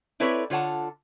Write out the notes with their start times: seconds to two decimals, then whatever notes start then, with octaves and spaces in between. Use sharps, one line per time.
0.20 C4 E4 A4 B4 C#5 D5
0.50 D3 F4 C#5 F#5 A5